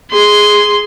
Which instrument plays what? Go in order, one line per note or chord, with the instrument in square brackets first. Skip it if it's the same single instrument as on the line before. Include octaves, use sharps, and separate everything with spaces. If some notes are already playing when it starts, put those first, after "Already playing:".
[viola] G#4 [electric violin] C6